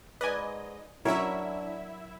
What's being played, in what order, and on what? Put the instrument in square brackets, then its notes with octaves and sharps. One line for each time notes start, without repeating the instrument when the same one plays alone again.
[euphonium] G#2 [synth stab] B4 D5 G#5 [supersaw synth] D#5
[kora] F#3 A#4 [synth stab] C#4 C#5 [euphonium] D4 [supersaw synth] E4 E5